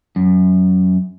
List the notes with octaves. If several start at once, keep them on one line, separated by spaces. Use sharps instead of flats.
F#2